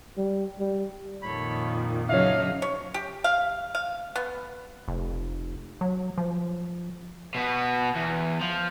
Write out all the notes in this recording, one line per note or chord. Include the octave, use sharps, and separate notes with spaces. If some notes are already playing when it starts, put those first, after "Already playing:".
G3
G3
F2 A#2 D#3 A4 C#5 B5
C#3 F#3 D4 D#4 C#5 E5 F5
C#5
G4
F5
F5
B3
F1
F#3
F3
B2 B3
E2
F3